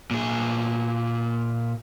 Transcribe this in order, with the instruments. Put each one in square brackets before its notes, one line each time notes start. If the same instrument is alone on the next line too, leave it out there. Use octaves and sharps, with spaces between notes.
[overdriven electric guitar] A#2 G#4